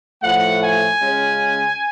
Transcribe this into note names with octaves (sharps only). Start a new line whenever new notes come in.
A2 F3 A3 F#5
G#5
C#3 G#3 C#4 F4